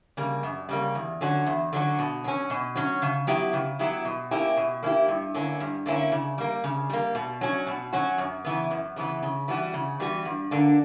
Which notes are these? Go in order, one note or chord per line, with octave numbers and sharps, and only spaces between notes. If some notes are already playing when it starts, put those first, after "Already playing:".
C#3 G3 A#3
F#2
C#3 G3 A#3
E2
D3 F#3 C#4 F#4
E2
D3 F#3 C#4 F#4
B2
F#3 C#4
B2
F#3 C#4
C#3
F#3 B3 E4 G4
C#3
F#3 B3 E4 G4
B2
A#3 C#4 E4 G4
B2
A#3 C#4 E4 G4
G2
D3 A#3 C#4 E4
G2
D3 A#3 C#4 E4
C#3
G3 A#3
C#3
G3 A#3
B2
F#3 C#4 F#4
B2
F#3 C#4 F#4
F#2
C#3 E3 B3
F#2
C#3 E3 B3
C#3
E3 G3 B3 F#4
C#3
E3 G3 B3 F#4
G2
D3 A#3 D4